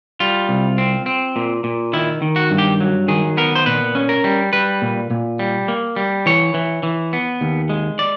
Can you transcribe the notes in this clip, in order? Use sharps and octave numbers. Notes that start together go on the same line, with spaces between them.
G3 F4
C2
C4
C4
A#2
A#2
D#3 E4
D#3
F#4
G2
G4
F#3
D#3 G#4
B3 A#4
C5
A#2 B4
C#4
A#4
G3
G3 B4
A#2
A#2
G3
A#3
G3
E3 C#5
E3
E3
B3
D#2
G#3
D5